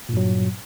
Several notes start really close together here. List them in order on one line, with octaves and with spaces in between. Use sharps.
A#2 G2 F#3